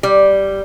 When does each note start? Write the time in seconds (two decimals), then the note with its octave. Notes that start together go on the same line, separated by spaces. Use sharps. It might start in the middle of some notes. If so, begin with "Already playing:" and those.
0.03 G3